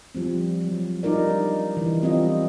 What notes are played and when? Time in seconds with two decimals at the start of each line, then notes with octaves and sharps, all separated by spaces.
0.15 F3 G3 C4
0.64 F#3
1.03 G3 D4 D#4 F4 A#4 D5
1.77 E3
2.02 G3 C4 F4 D#5